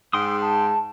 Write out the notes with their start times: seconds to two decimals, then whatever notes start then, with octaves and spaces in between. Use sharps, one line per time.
0.13 G#2 G5 C6 D#6
0.42 A5